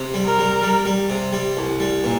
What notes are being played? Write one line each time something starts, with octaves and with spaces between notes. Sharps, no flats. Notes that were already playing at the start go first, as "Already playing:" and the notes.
Already playing: C3
G3
A#4
G3
G3
G3
C3
G3
C2
G3
A#2